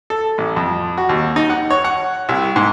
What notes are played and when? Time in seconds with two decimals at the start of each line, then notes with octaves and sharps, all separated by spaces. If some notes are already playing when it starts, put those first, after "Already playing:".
0.10 A4
0.38 A1
0.56 F2
0.98 F#4
1.09 D#2
1.36 D#4
1.50 F#5
1.70 C#5
1.84 F#5
2.29 C2
2.56 G#2